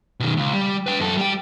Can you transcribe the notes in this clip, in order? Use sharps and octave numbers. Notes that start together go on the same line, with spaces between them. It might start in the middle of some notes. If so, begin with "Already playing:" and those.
B2 D#3
C#2
G3
B4 G5
F#2 A4
G3 G5